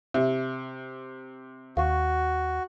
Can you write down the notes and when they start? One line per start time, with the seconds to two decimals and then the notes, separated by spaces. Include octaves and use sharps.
0.14 C3 E5
1.77 D#2 F#4 F5 C#6